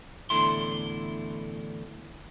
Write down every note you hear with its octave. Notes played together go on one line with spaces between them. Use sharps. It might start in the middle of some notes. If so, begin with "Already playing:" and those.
E2 A2 D3 D4 E4 C6